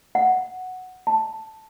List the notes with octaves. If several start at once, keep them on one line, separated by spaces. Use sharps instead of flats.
F#5
A5